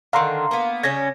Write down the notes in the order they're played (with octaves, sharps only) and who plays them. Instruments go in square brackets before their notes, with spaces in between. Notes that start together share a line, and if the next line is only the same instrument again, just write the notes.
[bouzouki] D3 D#3 [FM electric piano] F5 A#5 C6
[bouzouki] A#3 B3
[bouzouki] C#3 G3 C#4 [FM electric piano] G#6 A#6